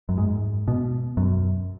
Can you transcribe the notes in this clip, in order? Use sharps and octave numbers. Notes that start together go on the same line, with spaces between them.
F#2
G#2
B2
F#2